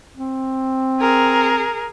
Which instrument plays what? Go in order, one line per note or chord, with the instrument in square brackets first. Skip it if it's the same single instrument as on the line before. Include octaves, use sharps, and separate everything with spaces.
[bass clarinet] C4
[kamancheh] G#4 A#4